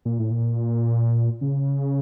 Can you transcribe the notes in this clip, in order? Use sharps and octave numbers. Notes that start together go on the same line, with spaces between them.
A#2
A2
A#2
C#3